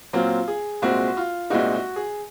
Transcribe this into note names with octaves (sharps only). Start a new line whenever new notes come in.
A#2 F#3 C4 F4
G#4
C2 A#2 G#3 C4 F#4
F4
C2 A#2 G#3 C4 D#4 F#4
F#4
G#4